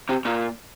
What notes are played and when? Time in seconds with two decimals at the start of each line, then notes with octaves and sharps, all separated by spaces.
0.09 C3
0.25 A#2